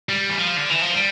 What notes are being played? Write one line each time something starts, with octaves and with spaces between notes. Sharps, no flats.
G3
E3
F3
D3
E3
F3
G3